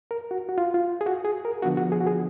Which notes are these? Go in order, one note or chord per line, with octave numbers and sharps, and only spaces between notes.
A#4
F#4
F#4
F4
F4
G#4
F#4
G#4
A#4
D3 F3 B3 D4 F#4
F#4
G#4
F#4
G#4